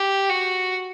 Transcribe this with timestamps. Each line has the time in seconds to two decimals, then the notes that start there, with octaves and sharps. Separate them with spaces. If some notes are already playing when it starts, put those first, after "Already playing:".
Already playing: G4
0.29 F#4